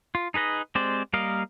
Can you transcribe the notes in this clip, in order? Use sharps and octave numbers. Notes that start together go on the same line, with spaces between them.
F4
D#4 G#4 B4 D#5
G#3 C4 G4 C5 D5
G3 A#3 A#4 D#5 F5